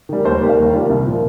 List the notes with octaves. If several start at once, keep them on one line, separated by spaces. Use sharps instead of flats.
D#3 G3
D#2 C5
A#4
D#3 G3 G4 F5
D#2 A#4
D#3 G3 F4
C2
A#2 F3